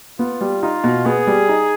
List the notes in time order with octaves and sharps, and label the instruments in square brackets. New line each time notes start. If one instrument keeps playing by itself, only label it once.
[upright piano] B3 [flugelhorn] F4
[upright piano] G3
[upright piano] D#4 [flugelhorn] F4
[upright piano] B2
[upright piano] B3 [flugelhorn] G#4
[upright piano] G3
D#4